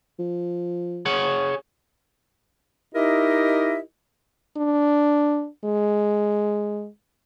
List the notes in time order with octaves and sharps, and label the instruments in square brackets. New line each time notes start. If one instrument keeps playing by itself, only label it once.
[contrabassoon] F3
[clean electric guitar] G#4 C#5 F#5
[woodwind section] D#4 E4 G4 A#4 D#5 E5
[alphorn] D4
G#3